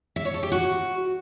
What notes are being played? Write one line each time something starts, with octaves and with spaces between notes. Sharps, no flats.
E5
C#5
A4
G4
F#4